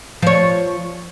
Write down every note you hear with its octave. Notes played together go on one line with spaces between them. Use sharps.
F3 C#5